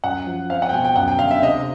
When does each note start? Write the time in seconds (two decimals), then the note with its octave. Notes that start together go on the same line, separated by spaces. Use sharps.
0.04 F#2 F#5
0.26 F3
0.50 C4 F5
0.62 F#5
0.69 G5
0.72 B2 G#5
0.85 G5
0.96 F#2 F#5
1.08 G5
1.19 D3 F5
1.31 E5
1.42 C3 D#5